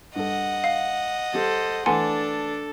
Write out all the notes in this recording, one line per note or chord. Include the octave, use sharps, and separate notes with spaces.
G2 A4 D#5 F#5
F5
G3 A4 C5
E3 A3 D4 A4 F#5 G#5 A5 C6